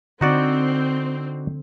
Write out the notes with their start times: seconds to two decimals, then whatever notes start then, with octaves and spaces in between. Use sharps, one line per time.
0.21 D3 C4 D#4 F#4 D5